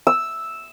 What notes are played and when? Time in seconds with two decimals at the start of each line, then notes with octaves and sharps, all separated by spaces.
0.07 E6